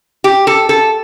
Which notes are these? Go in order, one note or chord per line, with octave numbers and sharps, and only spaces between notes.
G4
A4
A4